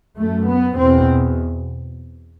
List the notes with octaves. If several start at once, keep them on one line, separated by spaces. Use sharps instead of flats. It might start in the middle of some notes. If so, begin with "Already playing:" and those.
F#2 A3
B3
E2 B2 C4